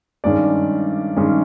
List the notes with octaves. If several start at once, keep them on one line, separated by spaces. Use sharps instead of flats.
G2 D#3 G#3 C#4 D5
G2 D#3 G#3 C#4